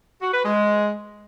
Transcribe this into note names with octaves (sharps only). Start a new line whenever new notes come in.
F#4
B4
G#3